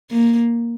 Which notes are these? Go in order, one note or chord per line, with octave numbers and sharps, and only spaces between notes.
A#3